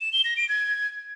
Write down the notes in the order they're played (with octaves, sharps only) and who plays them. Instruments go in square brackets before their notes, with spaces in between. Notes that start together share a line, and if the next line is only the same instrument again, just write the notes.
[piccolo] E7
G7
A#6
D7
G#6